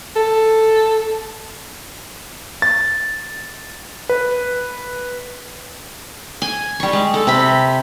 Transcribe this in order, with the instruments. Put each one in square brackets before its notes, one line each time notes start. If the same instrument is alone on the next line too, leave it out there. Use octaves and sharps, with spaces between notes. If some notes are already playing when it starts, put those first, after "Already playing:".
[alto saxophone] A4
[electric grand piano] A6
B4
[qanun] G#5
G3 C#6
G#3
A4
C3 E5 B5